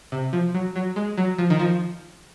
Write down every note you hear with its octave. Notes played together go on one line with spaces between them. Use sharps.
C3
F3
F#3
F#3
G#3
F#3
F3
D#3
F3